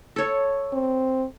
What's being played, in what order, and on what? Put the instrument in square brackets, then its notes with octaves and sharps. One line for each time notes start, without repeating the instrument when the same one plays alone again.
[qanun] A4 C#5
[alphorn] C4